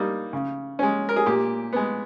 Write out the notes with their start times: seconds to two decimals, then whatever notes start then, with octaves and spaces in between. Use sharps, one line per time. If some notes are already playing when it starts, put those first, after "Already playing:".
Already playing: G3 A#3 D#4
0.33 C#3
0.79 G#3 C#4
1.09 A#4
1.16 G#4
1.26 A#2 G4
1.73 G#3 B3